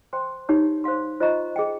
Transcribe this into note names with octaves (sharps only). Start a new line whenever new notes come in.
C5 G5 C6
D#4 G4 C#5
C5 F5 C6
F4 C5 D#5 A#5 C#6
G#4 D#5 G5